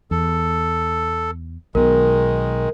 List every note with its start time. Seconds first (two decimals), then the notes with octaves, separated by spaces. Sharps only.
0.11 E2 A4
1.75 B1 B2 D#3 G#3 A#4